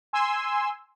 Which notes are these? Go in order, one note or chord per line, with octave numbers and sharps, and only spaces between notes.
G#5 C6 E6